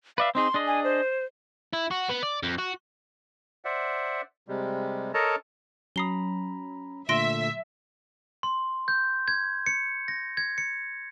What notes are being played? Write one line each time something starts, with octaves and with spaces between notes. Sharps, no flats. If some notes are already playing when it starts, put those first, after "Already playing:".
B4 D5 E5 F5
C4 D#4 G#4 C6
D4 G#4 D#5
G#5
C5
E4
F#4
B3
D5
F2
F#4
C5 D5 E5 F#5
C3 G3 G#3
A4 A#4 C#5 D#5 A5 A#5
F#3 C#4 A#5 B5 D#6 C7 G7
A#2 D3 A3 E5 C6 A#6 D7
C6
G6
G#6
C#7
A#6
G#6
C#7